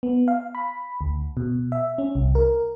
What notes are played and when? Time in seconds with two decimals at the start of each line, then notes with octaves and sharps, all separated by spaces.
0.03 B3
0.28 F5
0.55 B5
1.01 D2
1.37 B2
1.72 E5
1.98 C#4
2.15 C2
2.35 A#4